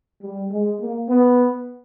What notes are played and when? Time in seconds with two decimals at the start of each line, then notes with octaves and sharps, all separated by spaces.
0.22 G3
0.51 G#3
0.81 A#3
1.09 B3